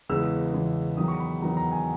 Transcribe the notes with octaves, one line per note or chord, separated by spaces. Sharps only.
E2 C#3 E3 G#3 E6
E2 C#3 E3 G#3
E2 D#3 F#3 D#6
C#6
B5
E2 D#3 F#3 A#5
A#5
G#5